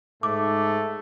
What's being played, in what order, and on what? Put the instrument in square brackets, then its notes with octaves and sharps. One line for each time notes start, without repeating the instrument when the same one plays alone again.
[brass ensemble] G#2 [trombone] A3 [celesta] D6